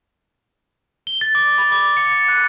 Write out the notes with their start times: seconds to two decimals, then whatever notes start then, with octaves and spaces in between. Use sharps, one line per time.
1.07 G7
1.21 A6
1.35 D6
1.58 B5
1.72 D6
1.97 C#7
2.12 A6
2.28 F#6